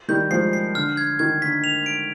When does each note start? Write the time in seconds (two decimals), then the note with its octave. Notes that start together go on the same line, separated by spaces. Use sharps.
0.08 D#3 G3 G6
0.31 F3 G#3 C7
0.53 C7
0.75 D3 F6
0.97 G#6
1.19 D#3 G#6
1.42 D3 B6
1.64 F7
1.86 D7